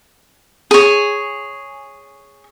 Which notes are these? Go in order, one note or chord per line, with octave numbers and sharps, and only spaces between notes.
G#4 C#5